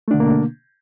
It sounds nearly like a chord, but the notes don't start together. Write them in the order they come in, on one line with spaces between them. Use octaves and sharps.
A3 D4 D3 B2 A#3